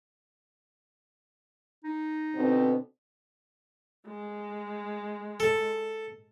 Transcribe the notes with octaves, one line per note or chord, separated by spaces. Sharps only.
D#4
B2 D3 C4
G#3
A4